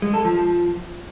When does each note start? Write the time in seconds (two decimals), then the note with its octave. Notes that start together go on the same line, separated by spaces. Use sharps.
0.02 G#3
0.14 A4
0.25 F3